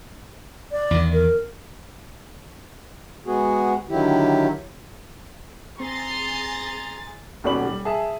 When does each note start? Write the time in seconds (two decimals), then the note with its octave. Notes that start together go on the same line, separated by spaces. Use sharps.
0.72 D5
0.91 E2 D#3
1.13 A#4
3.27 G#3 B3 F#4 G#4
3.90 D3 D#3 F#3 E4 G4
5.80 C4 G#4 A#5 C6 A6
7.44 D#1 B2 C#4 D5 B5 F#7
7.65 G3
7.85 G#4 E5 A5